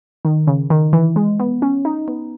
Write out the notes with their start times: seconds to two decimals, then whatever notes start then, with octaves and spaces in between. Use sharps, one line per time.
0.25 D#3
0.47 C#3
0.70 D#3
0.93 E3
1.16 G#3
1.40 B3
1.62 C#4
1.85 D#4
2.08 B3